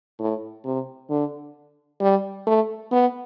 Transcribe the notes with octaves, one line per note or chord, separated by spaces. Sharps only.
A2
C3
D3
G3
A3
B3